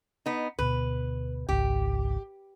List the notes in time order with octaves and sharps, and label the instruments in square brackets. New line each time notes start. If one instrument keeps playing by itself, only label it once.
[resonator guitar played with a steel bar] B3 D#4
[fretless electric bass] D2 B2 [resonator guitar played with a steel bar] B4
[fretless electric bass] G#1 C#2 [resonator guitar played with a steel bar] G4